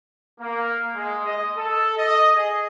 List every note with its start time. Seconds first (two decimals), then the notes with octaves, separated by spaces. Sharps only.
0.39 A#3
0.95 G#3
1.25 D#5
1.57 A4
1.98 D#5
2.36 G#4